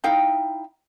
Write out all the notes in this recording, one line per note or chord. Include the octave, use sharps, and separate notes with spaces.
D#4 E4 F5 G5